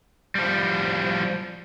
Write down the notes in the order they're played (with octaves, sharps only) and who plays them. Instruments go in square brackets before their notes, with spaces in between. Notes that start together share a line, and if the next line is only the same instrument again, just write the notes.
[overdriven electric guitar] F3 G3